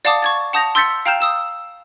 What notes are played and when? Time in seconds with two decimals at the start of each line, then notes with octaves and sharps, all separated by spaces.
0.05 D5 F5 F#5 A5 D6 D#6
0.22 C#6 G#6 A6
0.53 F#5 A5 D#6 G6 A#6 F7
0.75 C6 E6 G6 A6 B6 C#7
1.06 F5 G5 A#5 F6 G6 E7
1.20 D#6 E6 E7